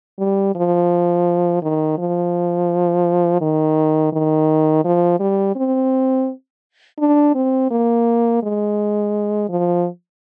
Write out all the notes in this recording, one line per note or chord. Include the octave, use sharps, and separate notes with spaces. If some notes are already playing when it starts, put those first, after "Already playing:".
G3
F3
D#3
F3
D#3
D#3
F3
G3
C4
D4
C4
A#3
G#3
F3